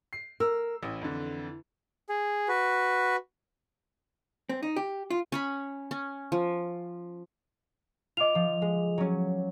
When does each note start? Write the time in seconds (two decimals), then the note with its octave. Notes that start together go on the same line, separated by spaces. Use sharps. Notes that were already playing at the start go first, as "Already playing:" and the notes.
0.13 C7
0.40 A#4 E6
0.83 A1 E3
1.02 F2 D3
2.09 G#4
2.48 F#4 B4
4.49 C4
4.63 D#4
4.76 G4
5.10 F4
5.32 C#4 C#5 B5
5.91 C#4
6.32 F3
8.17 F4 D#5 D6 F7
8.35 F3
8.62 G#3
8.98 F#3 C#4